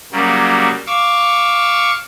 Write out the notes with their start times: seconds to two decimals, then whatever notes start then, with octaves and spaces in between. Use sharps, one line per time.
0.12 C#3 F#3 G3 A#3
0.87 F5 C#6 D6 E6